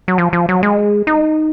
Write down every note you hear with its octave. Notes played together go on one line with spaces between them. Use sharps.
F#3
F3
F3
F#3
G#3
D#4